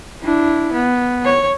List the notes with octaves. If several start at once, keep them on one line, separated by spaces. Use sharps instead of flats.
D4 E4
B3
C#5